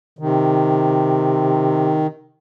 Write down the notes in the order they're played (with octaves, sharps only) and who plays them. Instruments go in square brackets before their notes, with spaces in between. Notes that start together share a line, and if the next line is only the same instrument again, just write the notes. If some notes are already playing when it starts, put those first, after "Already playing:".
[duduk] C3 [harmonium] D#3